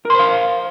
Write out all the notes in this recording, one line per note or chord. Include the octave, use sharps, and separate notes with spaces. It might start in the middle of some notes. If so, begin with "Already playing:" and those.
A#4 C5 F5 C6